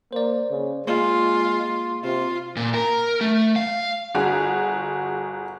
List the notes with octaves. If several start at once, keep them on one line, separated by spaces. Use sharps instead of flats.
A#3 C5 D5
C#3
G#3 A#3 F4
C3 F4
A#2
A#4
A3
F5
G1 F#4 G#4